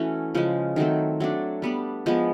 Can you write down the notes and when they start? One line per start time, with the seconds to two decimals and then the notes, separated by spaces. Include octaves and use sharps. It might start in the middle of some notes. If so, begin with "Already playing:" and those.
Already playing: E3 A3 C#4 F#4
0.35 C#3 F3 G#3
0.76 D#3 F#3 A3 C4
1.20 F#3 A3 D4
1.62 G3 B3 D4
2.06 F3 G#3 B3